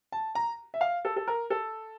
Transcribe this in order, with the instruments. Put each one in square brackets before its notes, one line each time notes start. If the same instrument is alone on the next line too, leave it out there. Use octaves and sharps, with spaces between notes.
[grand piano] A5
A#5
E5
F5
A4
A4
A#4
A4